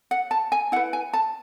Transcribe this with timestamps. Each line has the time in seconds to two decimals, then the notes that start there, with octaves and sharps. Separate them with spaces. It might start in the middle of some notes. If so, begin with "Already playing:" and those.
0.11 F#5
0.31 A5
0.52 G#5
0.72 E4 F#5
0.76 B4
0.93 G#5
1.13 A5